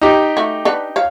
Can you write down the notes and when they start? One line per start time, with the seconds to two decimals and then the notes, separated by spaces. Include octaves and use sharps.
0.01 D#4 G4
0.37 A3 F#4
0.65 D4 B4 F#5
0.96 C#5 F5